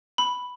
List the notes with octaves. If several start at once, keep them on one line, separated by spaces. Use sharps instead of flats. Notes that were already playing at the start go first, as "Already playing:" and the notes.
B5